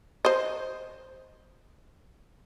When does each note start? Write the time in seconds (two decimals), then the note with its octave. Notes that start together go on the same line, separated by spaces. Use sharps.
0.25 C5 D#5